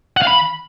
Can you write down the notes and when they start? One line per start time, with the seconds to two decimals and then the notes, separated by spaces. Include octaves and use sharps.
0.17 F#5
0.22 F5
0.27 B5